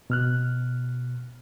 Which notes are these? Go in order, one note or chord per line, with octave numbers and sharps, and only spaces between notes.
B2 F6 F#6